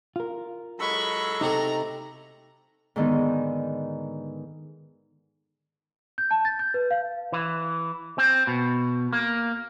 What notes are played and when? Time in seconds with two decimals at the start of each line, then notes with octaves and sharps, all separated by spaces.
0.16 F4 A#4
0.80 F#3 G#3 A4 B5 C#6
1.41 C3 A3 D#4 A#5
2.96 G#2 D3 D#3 B3 D#4
6.18 G6
6.31 A5
6.45 A6
6.59 G6
6.74 B4
6.91 F5
7.32 E3
8.18 C4
8.47 B2
9.13 A#3